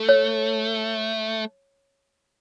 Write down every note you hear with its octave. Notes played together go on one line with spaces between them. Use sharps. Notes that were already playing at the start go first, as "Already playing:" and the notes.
Already playing: A3
C#5